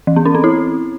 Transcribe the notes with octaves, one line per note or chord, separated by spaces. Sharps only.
E3
B3
C#4
C4
E4